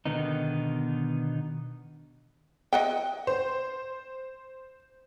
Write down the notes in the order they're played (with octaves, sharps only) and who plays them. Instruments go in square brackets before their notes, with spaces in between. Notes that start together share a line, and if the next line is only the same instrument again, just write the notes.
[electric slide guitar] B2 D3 D#3 B3 D#4
[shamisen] D#5 F#5 G5
[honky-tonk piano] C5